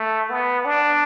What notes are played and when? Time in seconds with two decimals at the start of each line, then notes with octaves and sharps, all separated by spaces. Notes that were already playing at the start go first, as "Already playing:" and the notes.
Already playing: A3
0.30 B3
0.65 D4